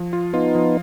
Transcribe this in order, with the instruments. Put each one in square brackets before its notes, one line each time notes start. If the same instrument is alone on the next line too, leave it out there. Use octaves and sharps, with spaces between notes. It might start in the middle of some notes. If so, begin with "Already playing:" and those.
Already playing: [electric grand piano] F3
F4
[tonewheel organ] B3 D#4 [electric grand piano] F4
[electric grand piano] F3